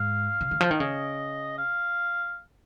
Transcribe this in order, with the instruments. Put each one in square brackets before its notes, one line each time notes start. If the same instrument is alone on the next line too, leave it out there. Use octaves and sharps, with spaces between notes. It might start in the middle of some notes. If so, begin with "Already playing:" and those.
Already playing: [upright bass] G#2 [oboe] F5
[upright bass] C#3
D#3
F3
D#3
[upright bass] C#3 [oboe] D#5
[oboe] F5